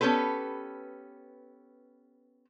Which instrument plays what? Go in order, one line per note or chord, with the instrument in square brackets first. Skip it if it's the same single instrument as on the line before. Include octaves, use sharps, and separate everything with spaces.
[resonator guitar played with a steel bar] B3 C#4 G4 A4 B4